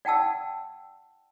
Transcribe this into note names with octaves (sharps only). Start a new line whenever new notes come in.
D5 F#5 G5 A5 E6